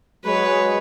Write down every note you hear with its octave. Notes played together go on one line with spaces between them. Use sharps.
F#3 G#3 B4 C#5